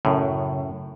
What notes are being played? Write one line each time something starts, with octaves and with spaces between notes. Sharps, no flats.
F#2 A2 C#3